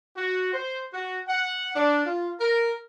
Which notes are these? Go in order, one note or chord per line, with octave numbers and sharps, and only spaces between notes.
F#4
C5
F#4
F#5
D4
F4
A#4